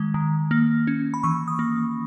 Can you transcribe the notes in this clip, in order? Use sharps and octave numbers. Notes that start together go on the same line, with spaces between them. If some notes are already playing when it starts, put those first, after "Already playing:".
Already playing: D#3 G#3
D#3
A#3
C#4
B5
E3 C#6
D#6
A#3